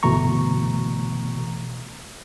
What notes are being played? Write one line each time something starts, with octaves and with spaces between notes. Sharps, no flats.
G1 B2 E3 A3 A#5 C#6